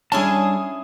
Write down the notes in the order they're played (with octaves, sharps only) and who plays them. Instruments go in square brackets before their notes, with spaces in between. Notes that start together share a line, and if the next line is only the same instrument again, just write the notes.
[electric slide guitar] G3 D4 A5 [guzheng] C#4 E4 G#4